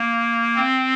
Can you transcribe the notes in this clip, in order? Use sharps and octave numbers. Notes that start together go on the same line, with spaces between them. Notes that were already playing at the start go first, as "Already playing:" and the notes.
Already playing: A#3
C4